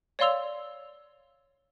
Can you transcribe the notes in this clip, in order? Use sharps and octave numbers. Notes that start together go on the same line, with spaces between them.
C#5 D5 F5 C6 E6 F7